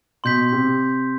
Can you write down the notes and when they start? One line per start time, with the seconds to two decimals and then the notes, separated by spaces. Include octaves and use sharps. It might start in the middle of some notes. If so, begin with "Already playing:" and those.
0.24 B2 C6 G6 B6
0.52 C3